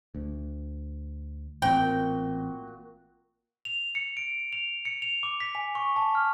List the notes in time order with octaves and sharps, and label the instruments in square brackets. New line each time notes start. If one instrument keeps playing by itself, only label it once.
[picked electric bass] D2
[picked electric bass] A1 C4 [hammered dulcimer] A#2 F#4 [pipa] G5
[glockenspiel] F7
C#7
D7
F7
C#7
F7
D6
B6
G#5
C#6
A5
F6